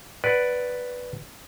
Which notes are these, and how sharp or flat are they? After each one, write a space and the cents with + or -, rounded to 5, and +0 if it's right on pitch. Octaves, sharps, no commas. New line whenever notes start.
B4 +0 D5 +0 F#5 +15